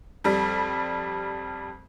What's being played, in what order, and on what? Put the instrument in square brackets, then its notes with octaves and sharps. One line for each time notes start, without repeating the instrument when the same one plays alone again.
[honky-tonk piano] F2 G3